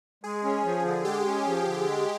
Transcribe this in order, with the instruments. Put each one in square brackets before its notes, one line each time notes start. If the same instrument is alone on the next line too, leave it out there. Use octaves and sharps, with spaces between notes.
[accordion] G#3 [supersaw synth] G#4
[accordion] C#4
F3
D3
[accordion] G#3 [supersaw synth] G4
[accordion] C#4
F3
D3
G#3